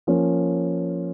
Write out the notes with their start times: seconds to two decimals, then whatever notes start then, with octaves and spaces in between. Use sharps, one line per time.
0.07 F3 A#3 C#4